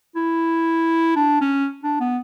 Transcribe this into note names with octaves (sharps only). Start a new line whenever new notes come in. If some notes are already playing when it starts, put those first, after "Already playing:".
E4
D4
C#4
D4
B3